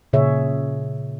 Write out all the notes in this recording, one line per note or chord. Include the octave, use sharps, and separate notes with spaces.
A#2 C#3 G#4 C#5 E5